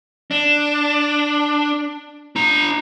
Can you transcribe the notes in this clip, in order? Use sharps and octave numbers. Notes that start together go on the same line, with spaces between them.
D4
D4 A#5